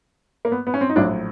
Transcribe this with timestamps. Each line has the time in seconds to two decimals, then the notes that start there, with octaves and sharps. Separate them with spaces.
0.45 A#3
0.52 B3
0.67 B3
0.74 C#4
0.81 C4
0.90 D#4
0.96 A#1 A2 F#3 D4